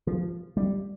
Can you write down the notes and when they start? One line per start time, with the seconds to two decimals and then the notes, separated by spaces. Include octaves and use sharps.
0.07 F3
0.57 G3